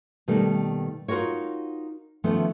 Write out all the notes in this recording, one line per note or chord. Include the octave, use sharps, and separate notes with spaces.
B2 D#3 G3 A3 A#3
D#4 F4 F#4 A#4 C#5
D#3 F3 A3 B3 C#4